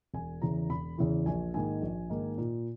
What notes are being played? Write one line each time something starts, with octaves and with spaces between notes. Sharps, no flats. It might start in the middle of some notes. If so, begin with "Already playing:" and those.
E1 G#5
E2 C#3 E3 A#5
E1 B5
E2 C#3 E3
A#1 G#5
G#2 D#3 A#3 G#5
A#1
G#2 D#3 A#3
A#2